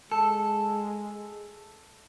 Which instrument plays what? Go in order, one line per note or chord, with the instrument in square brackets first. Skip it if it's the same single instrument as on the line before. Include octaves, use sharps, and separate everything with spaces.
[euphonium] G#3 [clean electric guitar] A4